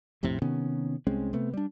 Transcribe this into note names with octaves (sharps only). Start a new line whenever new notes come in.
A#1 F2 A2 C3
C3 D#3 B3 C#4
C2 G#3 C4 C#4
C3 A3 B3
G3 D4